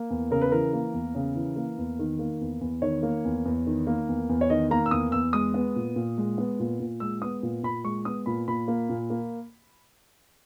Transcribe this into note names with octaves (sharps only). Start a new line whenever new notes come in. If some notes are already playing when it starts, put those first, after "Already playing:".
Already playing: A#3
E2
C#3 A#4
B4
E3 A#4
A#3
E2
C#3
E3
A#3
E2
D#3
A#3
E2
E2
D#3 C#5
A#3
E2
E2
D#3
A#3
E2
E2
C#5
D#3 D#5
A#3 A#5
E6
E2 D#6
E2 E6
G#3 D#6
B3
A#2
A#2
G#3
B3
A#2
A#2
G#3 E6
B3 D#6
A#2
A#2 B5
G#3 C#6
B3 D#6
A#2 B5
A#2 B5
A#3
A#2
A#3